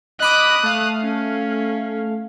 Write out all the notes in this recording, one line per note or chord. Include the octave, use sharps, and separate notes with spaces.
D#5 B5 D6 D#6 F#6
A3 F5
C#4